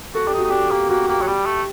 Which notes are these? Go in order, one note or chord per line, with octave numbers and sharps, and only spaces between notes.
F#4 A4
D4 G4
D#4
F#4
D#4
D4 G4
A#3 G4
A#3 F#4
A#3 G4
F#3
G3 G4
A3